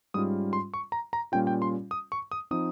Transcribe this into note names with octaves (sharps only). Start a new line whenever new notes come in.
G#2 G3 C#4 F4 D#6
C6
C#6
A#5
A#5
A#2 G3 C#4 F4 G5
G5
C6
D#6
C#6
D#6
F3 C4 D#4 D#6